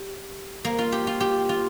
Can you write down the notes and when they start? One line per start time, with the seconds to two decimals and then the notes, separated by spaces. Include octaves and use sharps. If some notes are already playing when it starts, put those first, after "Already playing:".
Already playing: G4
0.65 A#3
0.78 F4
0.92 G4
1.07 F4
1.20 G4
1.49 F4